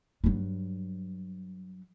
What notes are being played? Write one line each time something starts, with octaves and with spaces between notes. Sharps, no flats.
G2 F#3